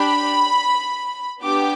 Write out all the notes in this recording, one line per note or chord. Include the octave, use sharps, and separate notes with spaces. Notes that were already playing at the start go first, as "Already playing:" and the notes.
Already playing: D4 G4 B5
B3 D4 G4 D6